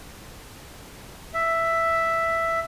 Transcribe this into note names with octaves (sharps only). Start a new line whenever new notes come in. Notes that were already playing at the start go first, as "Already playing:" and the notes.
E5